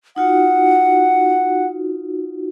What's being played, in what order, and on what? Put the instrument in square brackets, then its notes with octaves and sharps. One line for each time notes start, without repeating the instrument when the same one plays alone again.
[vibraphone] D#4 F4 F#4 [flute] F#5